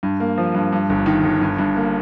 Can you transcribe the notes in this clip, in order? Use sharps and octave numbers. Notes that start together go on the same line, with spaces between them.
G2
A#3
F3
G2
G2
G1
D#3
G1
G2
G2
A#3